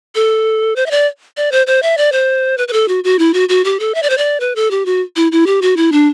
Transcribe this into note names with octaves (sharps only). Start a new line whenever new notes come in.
A4
C5
E5
D5
D5
C5
C5
E5
D5
C5
B4
B4
A4
F#4
F#4
E4
F#4
F#4
G4
A4
E5
D5
C5
D5
B4
A4
G4
F#4
E4
E4
G4
F#4
E4
D4